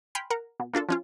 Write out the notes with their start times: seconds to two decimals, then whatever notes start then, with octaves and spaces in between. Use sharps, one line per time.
0.15 G5 G#5 B5 C6 F6 G6
0.30 A#4 F#5 A#5
0.60 B2
0.74 A#3 D4 F4 A4
0.89 F3 C#4 F4